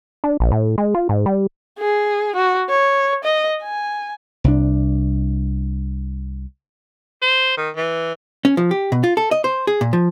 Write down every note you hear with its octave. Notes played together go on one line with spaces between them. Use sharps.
D4
A#1
A2
G#3
F4
G#2
G3
G#4
F#4
C#5
D#5
G#5
C2 D4
C5
D#3
E3
C#4
F3
G4
B2
F4
A4
D#5
C5
G#4
A#2
F3